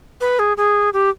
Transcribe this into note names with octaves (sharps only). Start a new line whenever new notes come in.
B4
G#4
G#4
G4